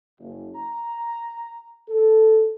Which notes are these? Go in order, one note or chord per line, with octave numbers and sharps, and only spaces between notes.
F#1
A#5
A4